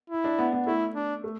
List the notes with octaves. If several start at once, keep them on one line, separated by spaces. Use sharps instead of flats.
E4
D4
B3
B3
A3 E4
D4
A3